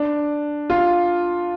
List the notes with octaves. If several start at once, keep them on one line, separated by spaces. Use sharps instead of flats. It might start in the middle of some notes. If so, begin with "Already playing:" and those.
Already playing: D4
F4